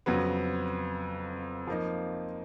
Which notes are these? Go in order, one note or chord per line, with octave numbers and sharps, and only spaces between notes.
F2 C#3 F#3 B3
F3 A#3 D#4